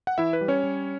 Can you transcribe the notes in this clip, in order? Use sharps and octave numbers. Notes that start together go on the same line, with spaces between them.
F#5
E3 E4 E5
B4
G3
C#4 C#5
G3